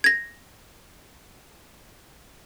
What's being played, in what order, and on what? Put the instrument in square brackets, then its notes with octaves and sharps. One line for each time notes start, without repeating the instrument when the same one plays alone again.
[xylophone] G#6 A#6